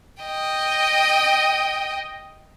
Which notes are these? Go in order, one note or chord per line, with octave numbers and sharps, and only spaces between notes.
D#5 G5